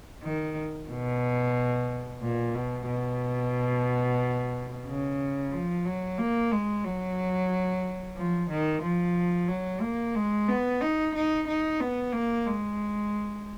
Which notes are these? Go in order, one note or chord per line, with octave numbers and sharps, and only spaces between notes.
D#3
B2
A#2
B2
B2
C#3
F3
F#3
A#3
G#3
F#3
F3
D#3
F3
F#3
A#3
G#3
B3
D#4
D#4
D#4
B3
A#3
G#3